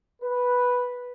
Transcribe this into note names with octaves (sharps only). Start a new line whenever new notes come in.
B4